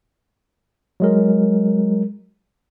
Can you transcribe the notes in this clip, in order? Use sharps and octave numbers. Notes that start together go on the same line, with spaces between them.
F#3 G#3 A#4